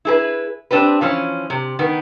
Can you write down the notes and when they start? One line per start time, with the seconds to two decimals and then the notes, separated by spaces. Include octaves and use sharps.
0.05 E4 G#4 B4
0.71 C4 D4 G4 B4
1.01 E3 F3 C#4
1.50 C3
1.79 D#3 B3